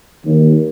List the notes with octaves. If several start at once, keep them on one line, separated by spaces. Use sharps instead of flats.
D#2